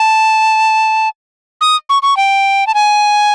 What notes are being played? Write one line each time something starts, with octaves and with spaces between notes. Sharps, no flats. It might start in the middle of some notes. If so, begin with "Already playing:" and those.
Already playing: A5
D#6
C#6
C#6
G5
A5
G#5